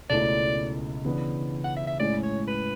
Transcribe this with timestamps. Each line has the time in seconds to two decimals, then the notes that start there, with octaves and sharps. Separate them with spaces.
0.10 C#2 B2 A3 C#4 E4 D5
1.05 C#3 E3 B3 D4
1.64 F#5
1.77 E5
1.87 E5
2.00 A2 G#3 C#4 E4 D5
2.23 C#5
2.48 B4